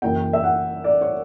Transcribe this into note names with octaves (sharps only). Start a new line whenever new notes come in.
F#1 F#2 E3 G5
E5
F#5
D5
C#5